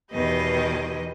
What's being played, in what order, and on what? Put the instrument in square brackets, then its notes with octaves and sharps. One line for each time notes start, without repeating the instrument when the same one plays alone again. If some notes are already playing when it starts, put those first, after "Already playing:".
[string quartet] E2 B2 D#3 G4 B4 D#5